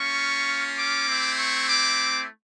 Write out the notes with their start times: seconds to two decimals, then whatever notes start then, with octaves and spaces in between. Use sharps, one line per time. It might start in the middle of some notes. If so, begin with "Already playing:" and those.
Already playing: A#3 C#4 F4 C#6
0.79 D6
1.08 A3 C4 E4
1.38 C#6
1.68 D6